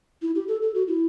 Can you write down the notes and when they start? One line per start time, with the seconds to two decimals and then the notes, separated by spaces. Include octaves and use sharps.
0.22 E4
0.35 G4
0.48 A4
0.62 A4
0.75 F#4
0.88 E4